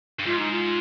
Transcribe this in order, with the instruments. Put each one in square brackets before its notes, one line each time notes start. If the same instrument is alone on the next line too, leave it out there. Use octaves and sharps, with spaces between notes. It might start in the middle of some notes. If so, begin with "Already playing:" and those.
[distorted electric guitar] G2
[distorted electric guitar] G#2 [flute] F4
[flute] D#4
F4